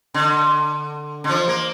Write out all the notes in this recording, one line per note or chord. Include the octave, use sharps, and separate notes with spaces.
D3
D3
F3
A#3